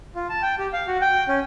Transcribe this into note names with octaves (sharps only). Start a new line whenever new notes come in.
F4
A5
G5
G4
F5
F#4
G5
C#4